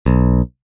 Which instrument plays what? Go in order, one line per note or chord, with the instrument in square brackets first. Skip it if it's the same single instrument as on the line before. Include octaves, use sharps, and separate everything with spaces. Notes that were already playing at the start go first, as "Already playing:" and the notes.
[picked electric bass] B1